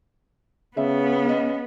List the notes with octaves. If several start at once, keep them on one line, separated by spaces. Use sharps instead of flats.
C#3 B3 E5
C#4 D#5